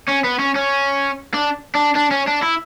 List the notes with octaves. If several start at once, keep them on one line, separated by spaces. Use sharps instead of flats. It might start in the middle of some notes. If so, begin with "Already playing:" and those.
C#4
B3
C#4
C#4
D4
D4
D4
C#4
D4
E4